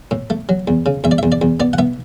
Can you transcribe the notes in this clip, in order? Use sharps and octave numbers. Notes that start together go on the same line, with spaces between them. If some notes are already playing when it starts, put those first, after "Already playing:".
A2
A3
F#3
E2
C#3
E2 E5
D5
E2 E5
D5
E2
B3 D5
F#5
B3 E5